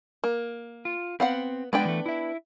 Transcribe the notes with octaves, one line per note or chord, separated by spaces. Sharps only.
A#3
F4
B3 C4 F5 F#5
G#3 B3 D4 D5 G5
E3 A3
E4 E5